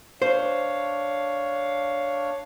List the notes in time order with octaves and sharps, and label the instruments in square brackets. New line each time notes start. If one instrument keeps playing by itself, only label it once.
[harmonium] D4 C#5 F5 [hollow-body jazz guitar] C5